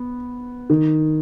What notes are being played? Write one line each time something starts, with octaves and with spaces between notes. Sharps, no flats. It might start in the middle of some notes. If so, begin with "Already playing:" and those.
Already playing: B3
D#3